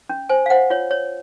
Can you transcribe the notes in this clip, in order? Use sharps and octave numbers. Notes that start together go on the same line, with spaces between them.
C#4
C5 G#5
F5
C5 F#5
F4 C#5
C#5